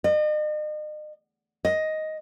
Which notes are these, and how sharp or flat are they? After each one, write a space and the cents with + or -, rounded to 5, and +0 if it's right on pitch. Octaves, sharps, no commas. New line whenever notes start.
D#5 -40
D#5 +5